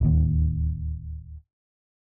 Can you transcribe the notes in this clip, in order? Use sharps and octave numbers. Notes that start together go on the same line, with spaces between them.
D1 D#2